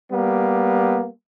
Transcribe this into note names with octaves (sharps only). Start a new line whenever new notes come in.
G3 A#3 B3